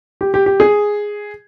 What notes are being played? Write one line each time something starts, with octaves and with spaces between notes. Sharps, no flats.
G4
G4
G4
G#4